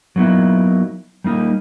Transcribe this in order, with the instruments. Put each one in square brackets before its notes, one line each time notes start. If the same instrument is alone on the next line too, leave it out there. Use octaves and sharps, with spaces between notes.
[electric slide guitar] F#3 A#3 B3 D#4 E4
G3 A#3 D#4